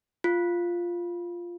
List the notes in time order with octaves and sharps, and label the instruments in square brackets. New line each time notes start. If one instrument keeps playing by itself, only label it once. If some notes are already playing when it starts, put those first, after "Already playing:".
[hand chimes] F4